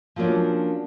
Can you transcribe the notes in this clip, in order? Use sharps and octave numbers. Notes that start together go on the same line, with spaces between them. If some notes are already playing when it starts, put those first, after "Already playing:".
F3 F#3 A#3 C#4 D4